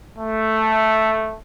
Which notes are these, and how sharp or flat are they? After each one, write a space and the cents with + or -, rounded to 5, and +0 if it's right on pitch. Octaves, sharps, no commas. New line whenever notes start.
A3 +0